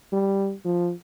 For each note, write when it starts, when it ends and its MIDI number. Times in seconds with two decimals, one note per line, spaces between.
0.13 0.54 55
0.65 0.92 53